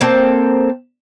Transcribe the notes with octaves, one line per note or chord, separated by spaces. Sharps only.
A#3 C4 A4